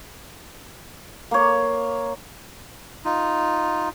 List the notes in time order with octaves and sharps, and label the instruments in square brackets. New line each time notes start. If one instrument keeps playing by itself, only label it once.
[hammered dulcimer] A#3 C#5
[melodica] D#4 F4